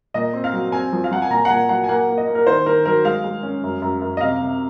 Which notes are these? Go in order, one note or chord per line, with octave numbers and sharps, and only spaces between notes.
A#2 D#5
C4
F5
F#3
C4 G#5
F3
F5
F3 F#5
G#5
A#2 A#5
F#5
A#2 G#5
F#3 F#5
G#5
A#3 F#5
A#3
D#5
A#3
A#4
D#3 C5
D#3 A#4
F#3 A#4
G#3 F5
G#3
C#4
F#2
F#2
F#2
D#5
C3 F5
C3